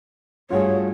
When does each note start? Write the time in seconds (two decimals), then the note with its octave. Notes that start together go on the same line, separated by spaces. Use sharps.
0.51 G2 A3 F4 F#4 G#4 C#5